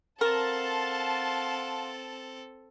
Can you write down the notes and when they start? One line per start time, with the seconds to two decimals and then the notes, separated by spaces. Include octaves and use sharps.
0.21 C4 A4 A#4 F5 F#5 A5 C6